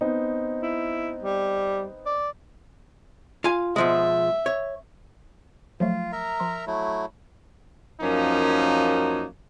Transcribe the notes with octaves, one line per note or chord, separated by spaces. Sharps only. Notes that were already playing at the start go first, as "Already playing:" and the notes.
B3 C4 D#4
E4
G3
D5
F4 F5 G#5
B2 F3 G#3 E5
C#5
F3 F#3 A3 F4
A#4 E5 A#5
F3 C6
F#3 A3 E4
F#2 F3 A#3 C#4 D#4